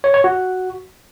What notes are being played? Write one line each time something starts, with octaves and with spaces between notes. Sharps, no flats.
C#5
C#5
F#4